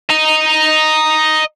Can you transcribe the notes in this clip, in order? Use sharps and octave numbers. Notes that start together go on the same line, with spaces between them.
D#5 A#5